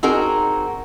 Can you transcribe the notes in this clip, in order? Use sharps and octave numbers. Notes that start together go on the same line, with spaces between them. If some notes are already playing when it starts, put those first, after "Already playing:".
C4 D#4 F#4 G#4 A#4